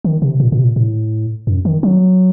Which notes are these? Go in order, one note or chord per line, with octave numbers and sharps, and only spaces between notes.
D#3
C3
A#2
A#2
C3
A#2
A2
F#2
D#3
F#3